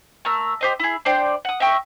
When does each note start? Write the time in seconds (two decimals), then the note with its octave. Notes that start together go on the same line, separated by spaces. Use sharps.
0.25 A3 A#4 E6
0.61 G4 C5 D#5
0.79 E4 G#4
1.05 D4 C5 D5 G5
1.45 F#5 D#6
1.60 D#5 E5 G5 C#6